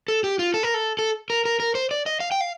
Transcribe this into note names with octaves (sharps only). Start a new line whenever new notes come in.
A4
G4
F4
A4
A#4
A4
A4
A#4
A#4
A#4
C5
D5
D#5
F5
G5
F5